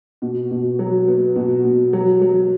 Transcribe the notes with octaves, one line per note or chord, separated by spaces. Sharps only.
B2
B2
F#3
B3
B2
B2
F#3
F#3